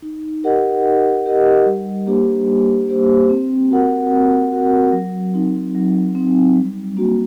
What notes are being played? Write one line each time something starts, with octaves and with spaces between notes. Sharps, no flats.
D#4
G4 A#4 D#5 F#5
D#4
G4 A#4 D#5 F#5
G3
A#3 D4 G4 C5
G3
A#3 D4 G4 C5
C4
F#4 A#4 F#5
C4
F#4 A#4 F#5
F#3
C4 D#4
F#3
C4 D#4
G3
A#3 D4 F#4